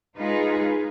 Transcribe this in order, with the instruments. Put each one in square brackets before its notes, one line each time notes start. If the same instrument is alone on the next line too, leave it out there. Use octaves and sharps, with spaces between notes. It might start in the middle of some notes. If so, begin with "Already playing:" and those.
[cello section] G#3 D#4 F4 G#4 B4